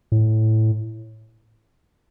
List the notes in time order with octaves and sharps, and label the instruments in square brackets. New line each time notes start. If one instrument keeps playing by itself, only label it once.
[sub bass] A2